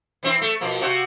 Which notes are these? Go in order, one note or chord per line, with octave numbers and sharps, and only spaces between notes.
E3 C4 E4
A3
B2 F3 A#3
C3 F#4